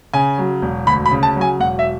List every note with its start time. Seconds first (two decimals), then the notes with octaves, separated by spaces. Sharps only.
0.13 C#3 G#5
0.38 F#3
0.62 E1
0.87 D2 B5
1.06 B5
1.11 C#3
1.23 A5
1.36 F#3
1.41 G#5
1.59 E1 F#5
1.79 E5